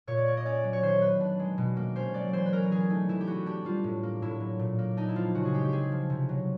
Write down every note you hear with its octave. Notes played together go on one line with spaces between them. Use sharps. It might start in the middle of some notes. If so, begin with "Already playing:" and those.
A#2 C#5
D5
A#3 C#5
D#5
C#4 D5
F#3
C#5
D#3 C5
B3 B4
D4
G#3
B2
A#3
C#4 C5
F#3 D5
E3 C5
B4
C#4 A#4
E3 G#4
A3 D#4
E3 E4
G4
B3 F#4
D4 G4
G3 F4
A2
A#3
A2 E4
F#3
A#2
A#3
D4 D#4
E4
F3 F4
C#3 F#4
G#4
G#3 G4
G4
C4 G#4
F3
C3
F#3